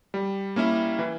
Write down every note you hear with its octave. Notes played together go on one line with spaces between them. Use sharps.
G3
A#3 C#4 E4
E3